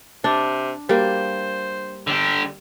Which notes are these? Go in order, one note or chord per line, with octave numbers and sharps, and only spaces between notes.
C3 D4
G3 A#3 C5
D3 G4